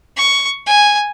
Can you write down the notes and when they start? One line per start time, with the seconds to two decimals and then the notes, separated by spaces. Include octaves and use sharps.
0.16 C#6
0.67 G#5